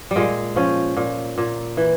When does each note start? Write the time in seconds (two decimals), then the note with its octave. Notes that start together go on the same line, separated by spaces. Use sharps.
0.11 G3
0.16 A#2 G#3
0.56 F3 C#4
0.97 A#2
1.38 A#2
1.77 E3